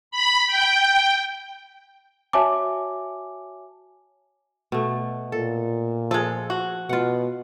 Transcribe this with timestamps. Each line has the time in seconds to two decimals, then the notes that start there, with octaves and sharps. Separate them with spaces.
0.11 B5
0.47 G5
2.33 F#4 C#5 E5 G#5 A5 D6
4.72 B2 A3
5.32 A#2 A4
6.11 F3 G#3 A4
6.50 F#4
6.89 B2 F4 F#5